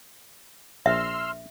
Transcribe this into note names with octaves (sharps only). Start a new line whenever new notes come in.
A#1 E5 C6 E6 F6